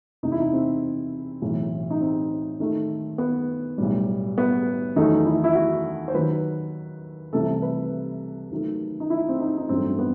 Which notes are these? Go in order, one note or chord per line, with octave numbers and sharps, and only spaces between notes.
E2 C3 E3 D#4
E4
D#4
C4
B1 A2 E3
D#4
C4
D#2 D#3 A3
B3
B1 A2 G3
B3
E2 D#3 F#3 A3 D#4
E4
E4
F#4
C5
D#2 D#3 F#3 B4
C2 C3 E3 A3 A4
B4
D#2 D#3 F#3 A3
D#4
E4
C4
D#4
D#4
A1 G2 F#3 A3 C4
B3